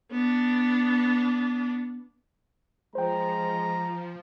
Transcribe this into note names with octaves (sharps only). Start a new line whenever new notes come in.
B3 D4
F3 G#3 C5 G5 A#5